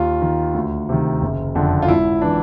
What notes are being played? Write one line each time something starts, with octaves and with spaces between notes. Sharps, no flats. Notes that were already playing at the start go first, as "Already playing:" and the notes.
Already playing: D#2 F4
D#3
D2
C3 D#3
F#1
F2 D3
F4
G#1 E4
E3 D4